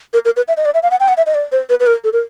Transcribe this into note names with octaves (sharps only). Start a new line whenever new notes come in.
A#4
A#4
B4
E5
D#5
D5
E5
F5
F#5
G5
F#5
E5
D#5
D5
C5
B4
B4
A#4
A4
A#4